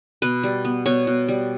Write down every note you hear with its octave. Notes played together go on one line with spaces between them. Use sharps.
B2 B4
G3
B3
B2 C#5
B2
G3